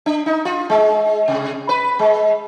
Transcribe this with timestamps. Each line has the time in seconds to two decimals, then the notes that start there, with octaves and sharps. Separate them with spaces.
0.06 D4
0.26 D#4
0.45 F4
0.70 G#3
1.28 C3
1.69 B4
1.99 G#3